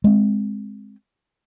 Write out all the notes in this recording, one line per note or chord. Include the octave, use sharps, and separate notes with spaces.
G#3 C4